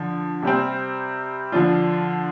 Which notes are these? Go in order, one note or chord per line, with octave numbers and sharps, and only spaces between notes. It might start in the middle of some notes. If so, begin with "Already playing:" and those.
Already playing: D3 F3
C3 G3 C4
D3 F3 D4 F4